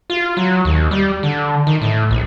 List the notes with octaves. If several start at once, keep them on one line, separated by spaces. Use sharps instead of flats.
F4
F#3
D#2
G3
D3
D#3
A2
A#1